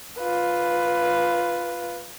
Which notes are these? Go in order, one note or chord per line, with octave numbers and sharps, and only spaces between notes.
F4 B4